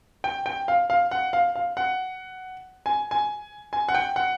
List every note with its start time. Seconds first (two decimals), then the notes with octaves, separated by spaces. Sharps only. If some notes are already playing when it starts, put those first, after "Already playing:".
0.24 G5
0.46 G5
0.68 F5
0.90 F5
1.11 F#5
1.33 F5
1.56 F5
1.77 F#5
2.86 G#5
3.11 G#5
3.73 G#5
3.89 F#5
3.95 G5
4.16 F#5